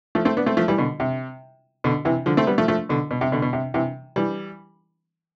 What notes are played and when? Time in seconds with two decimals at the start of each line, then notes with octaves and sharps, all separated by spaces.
0.15 F3 A3
0.25 A3 C4
0.37 B3 D4
0.46 A3 C4
0.57 F3 A3
0.68 E3 G3
0.78 B2 D3
1.00 C3
1.84 B2 D3
2.05 C3 E3
2.26 D3 F3
2.37 A3 C4
2.47 G3 B3
2.58 F3 A3
2.68 F3 A3
2.89 B2 D3
3.11 B2
3.21 C3
3.32 B2 D3
3.42 B2
3.53 C3
3.74 C3 E3
4.16 E3 G3